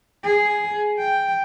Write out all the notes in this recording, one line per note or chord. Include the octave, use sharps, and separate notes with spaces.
G#4
G5